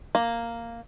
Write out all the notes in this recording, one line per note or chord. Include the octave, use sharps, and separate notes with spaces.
A#3